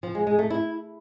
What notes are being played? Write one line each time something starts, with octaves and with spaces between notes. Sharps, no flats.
F3
G#3
G#3
A3
E4